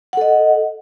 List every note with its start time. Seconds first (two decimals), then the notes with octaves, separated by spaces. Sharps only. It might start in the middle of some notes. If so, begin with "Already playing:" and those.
0.13 F#5
0.17 A4
0.21 D#5